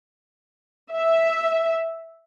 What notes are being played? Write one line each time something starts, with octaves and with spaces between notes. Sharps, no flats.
E5